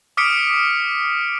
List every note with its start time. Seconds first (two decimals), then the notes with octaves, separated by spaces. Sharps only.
0.17 D6 D#6 F6 B6 C#7 D7